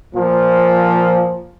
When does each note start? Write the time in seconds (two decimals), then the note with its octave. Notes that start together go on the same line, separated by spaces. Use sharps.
0.15 A#2 F3